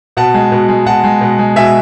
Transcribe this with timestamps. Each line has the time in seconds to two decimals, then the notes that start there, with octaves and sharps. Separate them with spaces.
0.17 B2 F#5 A5
0.34 G#3
0.52 B2
0.69 G#3
0.86 B2 F#5 A5
1.04 G#3
1.21 B2
1.39 G#3
1.56 B2 E5 G#5